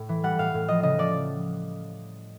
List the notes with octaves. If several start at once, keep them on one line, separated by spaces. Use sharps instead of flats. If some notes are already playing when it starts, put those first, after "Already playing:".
Already playing: A2
E3
G3 F#5
A2 F5
A2
F3 D#5
C#3 D#5
F3 D5